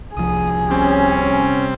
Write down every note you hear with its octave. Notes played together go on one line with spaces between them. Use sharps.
C2 F3 G#4 D#6
C3 G3 C4 C#4